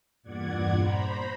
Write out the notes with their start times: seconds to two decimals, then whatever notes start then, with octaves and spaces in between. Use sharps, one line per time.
0.23 E2 G2 A#2 D5 F#5 G#6
0.74 C5 A#5 B5